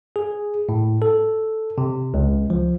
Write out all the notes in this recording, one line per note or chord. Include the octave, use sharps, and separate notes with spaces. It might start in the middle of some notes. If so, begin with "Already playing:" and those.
G#4
A2
A4
C3
C#2
F3